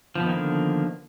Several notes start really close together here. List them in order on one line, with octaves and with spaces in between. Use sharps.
F3 B3 D#3 A#3 D3